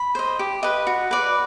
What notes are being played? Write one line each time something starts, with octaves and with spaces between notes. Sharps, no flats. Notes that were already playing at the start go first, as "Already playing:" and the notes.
Already playing: B5
C5 D#5
G4
B4 D#5
F#4
B4 D5